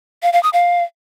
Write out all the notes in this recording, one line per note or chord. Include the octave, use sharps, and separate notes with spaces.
F5
F5
D#6
F5